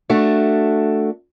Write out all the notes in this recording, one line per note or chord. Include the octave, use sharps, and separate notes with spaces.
A3 D4 F#4